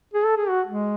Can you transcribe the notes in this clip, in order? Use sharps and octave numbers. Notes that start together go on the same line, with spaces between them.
G#4
A4
G#4
F#4
G#3